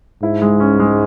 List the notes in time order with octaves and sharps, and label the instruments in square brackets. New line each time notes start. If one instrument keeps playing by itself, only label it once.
[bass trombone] G#2 [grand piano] E4
[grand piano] G#3
C#4
G#3